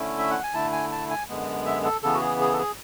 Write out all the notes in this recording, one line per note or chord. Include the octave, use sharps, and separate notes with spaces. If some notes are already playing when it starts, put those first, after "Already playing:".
Already playing: D3 A3 C#4 E4
E5
F#5
G#5
D3 A3 E4 A5
G#5
A5
G#5
F#2 D3 G#3 B3
E5
A4
C#3 E3 B3 A4
F#4
G#4
G#4
A4
G#4